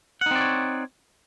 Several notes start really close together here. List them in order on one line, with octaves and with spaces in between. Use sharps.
F#5 D#4 C4 D5 C#5